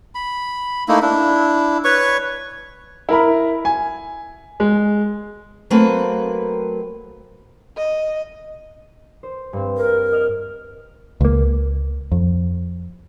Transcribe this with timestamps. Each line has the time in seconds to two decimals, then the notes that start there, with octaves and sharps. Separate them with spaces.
0.15 B5
0.88 A3 A#3 D#4 E4
1.02 D4 E4
1.84 B4 C#5 C#6
3.09 E4 A#4 B5
3.65 G#5
4.60 G#3
5.70 F#3 A3 A#3 C4 B4
7.77 D#5
9.23 C5
9.53 G2 C4
9.78 A#4
10.12 D#5 F6
11.21 C#2 A#3
12.12 F2